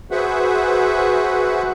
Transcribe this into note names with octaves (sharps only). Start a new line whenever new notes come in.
F#4 G#4 B4 C5 E5 F#5